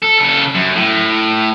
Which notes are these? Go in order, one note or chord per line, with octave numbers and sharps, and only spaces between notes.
A4
C#3 A4
F#2
A2